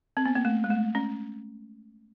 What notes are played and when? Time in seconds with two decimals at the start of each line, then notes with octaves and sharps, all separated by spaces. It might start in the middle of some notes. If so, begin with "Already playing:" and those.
0.17 C4
0.26 B3
0.35 A#3
0.45 A3
0.64 G#3
0.70 A3
0.95 C#4